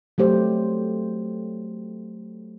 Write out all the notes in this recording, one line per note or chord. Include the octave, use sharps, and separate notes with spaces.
F#3 A3 G4 C5